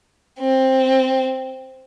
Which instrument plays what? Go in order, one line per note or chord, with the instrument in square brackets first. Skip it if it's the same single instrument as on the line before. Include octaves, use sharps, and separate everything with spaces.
[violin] C4